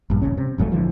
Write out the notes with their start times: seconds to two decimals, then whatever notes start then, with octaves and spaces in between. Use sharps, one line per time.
0.10 A#1 G2
0.22 D#1 C#2 C#3 C#4
0.38 C3
0.58 F1 G#2 F#3 A3
0.72 A#1 D3 E3 F3